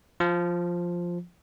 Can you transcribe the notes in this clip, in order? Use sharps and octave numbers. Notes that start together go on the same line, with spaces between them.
F3